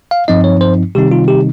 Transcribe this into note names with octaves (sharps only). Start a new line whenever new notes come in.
F5
G2 F3 C4 D#4 D#5
C#5
C5
C3 D#3 G3 C4 D#4 G4
F4
G4